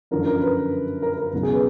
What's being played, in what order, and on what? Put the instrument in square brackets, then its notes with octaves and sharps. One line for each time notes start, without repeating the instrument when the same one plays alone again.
[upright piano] F#2 D3 F3 A#4
A#4
B4
A#4
A#4
C#2 B2 F#3
G#4
B4